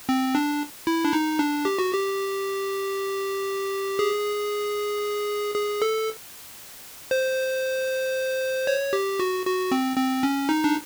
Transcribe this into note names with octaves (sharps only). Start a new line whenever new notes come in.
C4
D4
E4
D4
D#4
D4
G4
F#4
G4
G#4
G#4
A4
C5
C#5
G4
F#4
F#4
C4
C4
C#4
D#4
D4